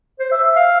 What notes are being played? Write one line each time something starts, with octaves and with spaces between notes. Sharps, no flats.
C5
E5
E5
F5